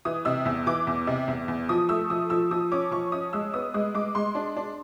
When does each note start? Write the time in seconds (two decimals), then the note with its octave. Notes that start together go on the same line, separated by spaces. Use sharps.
0.05 E3 D#6
0.25 C3 E6
0.45 E2
0.66 E3 D6
0.87 E2
1.07 C3
1.28 E2
1.48 E2
1.69 F3 D#6
1.89 A3 E6
2.10 F3 D#6
2.30 F3 E6
2.51 F3 D#6
2.72 C#4 D6
2.91 F3 C#6
3.12 C#4 D#6
3.33 G#3 E6
3.54 B3 D#6
3.74 G#3 D#6
3.94 G#3 D6
4.15 G#3 C6
4.35 D4
4.57 D4